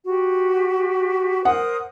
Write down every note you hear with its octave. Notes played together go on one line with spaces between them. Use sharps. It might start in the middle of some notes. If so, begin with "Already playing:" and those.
F#4 G4
A#4 C5 F#5 D#6